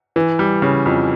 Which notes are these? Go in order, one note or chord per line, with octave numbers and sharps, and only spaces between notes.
E3
G3
C#3
F2